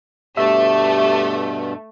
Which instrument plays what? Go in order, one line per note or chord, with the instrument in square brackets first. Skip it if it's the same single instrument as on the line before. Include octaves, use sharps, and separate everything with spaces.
[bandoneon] G2 B2 [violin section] A3 [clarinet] G4 [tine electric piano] E5